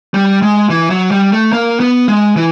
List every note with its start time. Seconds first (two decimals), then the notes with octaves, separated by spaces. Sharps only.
0.14 G3
0.42 G#3
0.70 E3
0.90 F#3
1.11 G3
1.32 A3
1.53 A#3
1.80 B3
2.08 G#3
2.36 E3